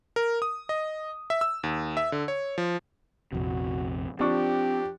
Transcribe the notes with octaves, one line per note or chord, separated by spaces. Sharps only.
A#4
D#6
D#5
E5
E6
D#2
E5
D3
C#5
F3
A#1 F2 C3 F#4
F3 C4 D4 G4 C#6